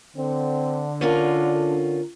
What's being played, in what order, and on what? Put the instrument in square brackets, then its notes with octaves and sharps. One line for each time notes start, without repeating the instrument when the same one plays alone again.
[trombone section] D3 [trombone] C4
[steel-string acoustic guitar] C#4 F4 A#4 [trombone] D4